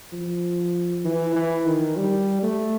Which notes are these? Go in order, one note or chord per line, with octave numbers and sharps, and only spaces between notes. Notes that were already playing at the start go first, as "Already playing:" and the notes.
F3
E3
E3
D#3
G3
A3